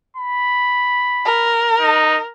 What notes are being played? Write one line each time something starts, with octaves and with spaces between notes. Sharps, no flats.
B5
A#4
D#4